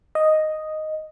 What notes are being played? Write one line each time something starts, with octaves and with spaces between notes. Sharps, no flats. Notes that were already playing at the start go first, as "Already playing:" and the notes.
D#5